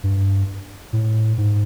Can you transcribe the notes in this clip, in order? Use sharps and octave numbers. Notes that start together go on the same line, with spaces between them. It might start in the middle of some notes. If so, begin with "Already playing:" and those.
G2
A2
G#2